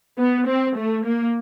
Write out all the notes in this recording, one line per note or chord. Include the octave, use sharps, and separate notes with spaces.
B3
C4
A3
A#3